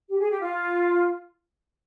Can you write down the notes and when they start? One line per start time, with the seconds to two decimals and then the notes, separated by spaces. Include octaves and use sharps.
0.09 G4
0.20 G#4
0.30 G4
0.41 F4